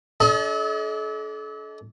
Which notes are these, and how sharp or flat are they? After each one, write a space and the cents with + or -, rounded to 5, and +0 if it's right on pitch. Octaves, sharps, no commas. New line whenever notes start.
D4 -25 A4 -40 D#5 +35